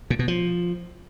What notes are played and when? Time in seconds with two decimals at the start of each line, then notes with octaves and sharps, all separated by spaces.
0.10 A#2
0.19 B2
0.28 F3